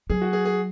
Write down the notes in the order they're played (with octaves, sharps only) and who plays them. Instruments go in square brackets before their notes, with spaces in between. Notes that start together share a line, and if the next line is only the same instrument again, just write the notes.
[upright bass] F#3 [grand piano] G#4
[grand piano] F#4
G#4
G#4